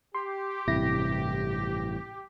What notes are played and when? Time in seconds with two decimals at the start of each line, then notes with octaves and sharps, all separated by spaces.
0.15 G4 C6
0.67 A1 G2 C3 E4 A#6